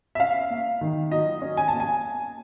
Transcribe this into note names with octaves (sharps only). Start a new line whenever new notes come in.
E5
C#4 F5
A#3
D#3
F#3 D#5
C#4
G#5
A#3 A5
G#5